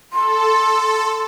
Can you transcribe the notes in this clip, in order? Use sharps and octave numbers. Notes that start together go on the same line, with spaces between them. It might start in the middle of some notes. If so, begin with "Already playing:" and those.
A4 C6